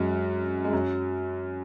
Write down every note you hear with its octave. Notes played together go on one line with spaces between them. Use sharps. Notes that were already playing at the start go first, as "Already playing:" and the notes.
Already playing: F#2 F#3 G#3
G#3
F#2 F#3